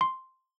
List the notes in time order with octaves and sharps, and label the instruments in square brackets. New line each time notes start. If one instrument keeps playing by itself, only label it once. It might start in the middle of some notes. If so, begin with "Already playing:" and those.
[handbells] C6